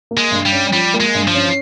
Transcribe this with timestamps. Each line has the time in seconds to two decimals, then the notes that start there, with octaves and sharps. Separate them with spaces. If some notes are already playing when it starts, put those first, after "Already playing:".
0.11 A#3
0.17 G#3
0.31 G2
0.45 G3
0.52 C#4
0.73 F3 G3
0.94 A#3
1.00 G#3
1.15 G2
1.27 F3
1.34 C#4